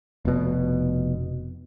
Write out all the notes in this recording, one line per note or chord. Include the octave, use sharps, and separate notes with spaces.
F1 B2